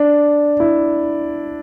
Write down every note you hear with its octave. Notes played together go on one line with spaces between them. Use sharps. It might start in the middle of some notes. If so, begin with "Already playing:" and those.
Already playing: D4
E4